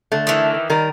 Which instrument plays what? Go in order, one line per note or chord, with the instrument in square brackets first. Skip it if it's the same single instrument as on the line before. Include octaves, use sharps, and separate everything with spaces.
[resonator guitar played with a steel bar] D3 A3
[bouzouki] D#3 E3
[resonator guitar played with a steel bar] D#3 G3 A#4